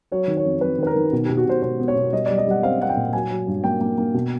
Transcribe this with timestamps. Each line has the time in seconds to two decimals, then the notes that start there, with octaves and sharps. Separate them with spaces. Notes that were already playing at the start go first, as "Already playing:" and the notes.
0.12 F#3 C#5
0.28 D#3
0.37 C#5
0.44 F2
0.61 F2 B4
0.78 D#3 B4
0.87 A#4
0.96 D#3
1.12 B2
1.25 G4
1.29 B2
1.37 F#4
1.46 B2 C5
1.62 B2 C5
1.79 B3
1.88 C#5
1.96 B2
2.12 G3 D#5
2.26 D5
2.30 G3
2.38 D#5
2.47 G3 F#5
2.63 C4 F5
2.80 C4 F#5
2.89 G5
2.97 A#2
3.13 F#3 G#5
3.30 F#3
3.47 G2
3.64 A#3 G5
3.81 A#3
3.98 A#3
4.14 B2